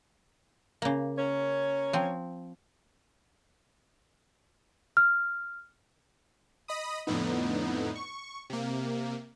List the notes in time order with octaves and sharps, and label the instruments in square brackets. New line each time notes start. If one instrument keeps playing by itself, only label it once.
[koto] C#3 A#3
[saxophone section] C#4 A#4 C#5
[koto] F3 C4
[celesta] F6
[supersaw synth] D#5 B5 D#6
F2 A2 D3 B3 D#4
C#6
C3 A#3